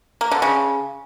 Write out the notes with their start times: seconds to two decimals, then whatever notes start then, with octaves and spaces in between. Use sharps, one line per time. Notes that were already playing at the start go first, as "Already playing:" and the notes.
0.21 A#3
0.32 D3
0.42 C#3